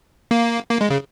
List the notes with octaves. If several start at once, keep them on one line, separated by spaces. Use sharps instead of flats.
A#3
A#3
G#3
C#3